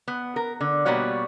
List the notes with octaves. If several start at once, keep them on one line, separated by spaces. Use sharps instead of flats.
B3
A#4
D3
B2 G3 A#3 B3 F#4 C#5